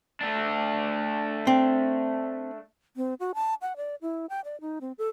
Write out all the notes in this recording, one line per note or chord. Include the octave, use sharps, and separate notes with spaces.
A3 D4
C4
C4
F#4
A5
F#5
D5
E4
G5
D5
D#4
C4
A4